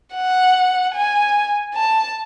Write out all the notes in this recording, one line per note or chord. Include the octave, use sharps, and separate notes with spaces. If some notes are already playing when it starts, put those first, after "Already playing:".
F#5
G#5
A5